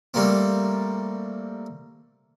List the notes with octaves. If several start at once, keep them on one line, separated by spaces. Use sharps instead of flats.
G3 A3 A#3 C4